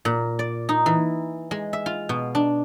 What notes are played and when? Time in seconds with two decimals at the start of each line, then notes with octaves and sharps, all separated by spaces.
0.05 A#2
0.39 D5
0.69 D#4
0.86 E3
1.51 G#3
1.73 E5
1.86 F4
2.09 B2
2.35 D4